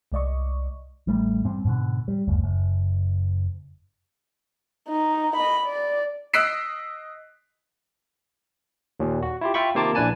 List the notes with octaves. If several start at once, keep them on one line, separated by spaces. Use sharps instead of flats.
C2 G#3 D5 D#5 C#6
A1 G3 A3
G#2 G3 C4
G#2 B2 D3
G3
F#1 D2
F#1
D#4
D#5 B5
D5
D#5 E6 F#6 B6 C7 D7
D#2 A#2
F#4
E4 F4 G4
F4 E5 G5 B5 C#6
C3 D#3 A#3 F4 A5 D6
A#1 E3 D4 B4 G#5 A5